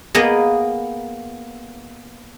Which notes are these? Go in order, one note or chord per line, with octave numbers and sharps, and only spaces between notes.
A#3 B3 G#4 D#5